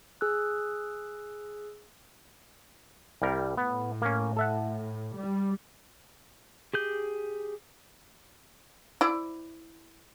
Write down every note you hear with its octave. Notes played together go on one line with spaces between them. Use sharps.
G#4 E6 F#6
C2 G3 A#4
A2 B3
A#3 C#4
A4 E5 F#5
G3
G4 G#4 G6
E4 C5 D5